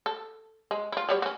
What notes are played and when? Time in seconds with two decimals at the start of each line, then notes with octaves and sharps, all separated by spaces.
0.06 A4
0.71 G#3
0.92 E4 F4
1.09 F#3 G3 C#5
1.22 C#4 F#4